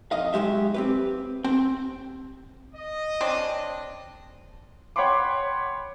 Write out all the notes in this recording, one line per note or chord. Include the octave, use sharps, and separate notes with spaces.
F2 D#5 F5
B1 F#3 G#3 G4 E5
C4 G4 B4
C4 G5
D#5
C#3 C4 D4
C#5 F#5 G5 B5 C6 D6